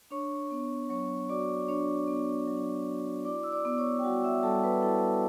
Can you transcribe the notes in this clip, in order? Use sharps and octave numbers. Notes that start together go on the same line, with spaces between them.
D4 C#5 C#6
B3
F#3 C#5 C#6
F#4 D5 D6
D4 C#5 C#6
B3
F#3
F#4
E4 D5 D6
E6
D5 D6
B3
C#5 C#6
G5
G3 F#4 F#5
E5 E6
G3 A4 A5
B4 B5
E4 A4 A5